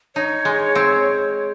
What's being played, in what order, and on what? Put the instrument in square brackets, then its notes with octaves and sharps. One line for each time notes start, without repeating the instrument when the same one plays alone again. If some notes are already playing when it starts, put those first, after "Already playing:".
[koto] D#4 [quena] C#5
[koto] G#3
C4